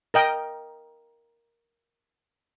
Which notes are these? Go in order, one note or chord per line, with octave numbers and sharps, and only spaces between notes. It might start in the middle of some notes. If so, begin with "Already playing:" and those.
A#4 D#5 G5